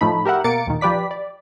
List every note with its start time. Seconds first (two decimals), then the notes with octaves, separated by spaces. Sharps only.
0.01 A2 F3 A3 D#4 B5
0.25 G4 A#4 E5 F#5
0.44 B2 A#3 A6 C#7 D7
0.67 D#2 A#2 D#3
0.81 F3 G4 B4 D5 B6
1.11 D5